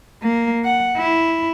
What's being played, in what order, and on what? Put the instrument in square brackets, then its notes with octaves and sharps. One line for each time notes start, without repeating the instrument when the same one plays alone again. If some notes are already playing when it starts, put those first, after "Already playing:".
[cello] A#3
F#5
E4